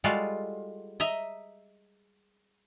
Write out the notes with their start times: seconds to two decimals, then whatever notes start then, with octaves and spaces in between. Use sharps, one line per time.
0.04 G3 G#3 F4 F#4 A4
1.00 D#5 E5 A#5